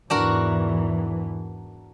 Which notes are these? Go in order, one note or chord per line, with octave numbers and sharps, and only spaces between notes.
E2 G#2 E3 D4 F#4 A#4